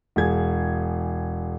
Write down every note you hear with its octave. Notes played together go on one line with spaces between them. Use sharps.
E1 G#4 G#6